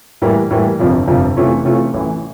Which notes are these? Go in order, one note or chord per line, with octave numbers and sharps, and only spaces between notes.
A2 E3 G3 A#3
A2 E3 G3 A#3
G1 F2 C3 F3
G1 F2 C3 F3
C3 E3 A3 C#4 F4
C3 E3 A3 C#4 F4
A1 A2 E3